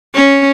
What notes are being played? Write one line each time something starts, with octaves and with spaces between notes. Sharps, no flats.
C#4